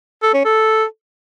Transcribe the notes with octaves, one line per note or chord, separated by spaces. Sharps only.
A4
C#4
A4